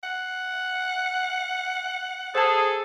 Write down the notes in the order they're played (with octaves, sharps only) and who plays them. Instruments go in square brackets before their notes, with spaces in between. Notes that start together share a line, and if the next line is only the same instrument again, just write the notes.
[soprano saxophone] F#5
[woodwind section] G#4 [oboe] A4 [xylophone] C5 A5